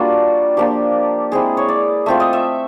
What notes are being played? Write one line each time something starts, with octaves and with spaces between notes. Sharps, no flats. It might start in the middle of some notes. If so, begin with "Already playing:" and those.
Already playing: G3 A#3 D4 F4 F#4
F3 A#3 D4 G4
G#3 C4 E4 G#4
C#5
D5
A3 C4 F4 E5
D#5
E5